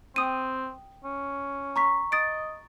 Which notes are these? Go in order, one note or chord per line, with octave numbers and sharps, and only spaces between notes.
C4 G5 D#6 D#7
C#4
A#5 C#6 B6
D#5 D#6 A6 D7